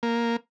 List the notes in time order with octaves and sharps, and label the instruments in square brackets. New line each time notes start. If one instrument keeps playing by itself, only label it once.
[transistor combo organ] A#3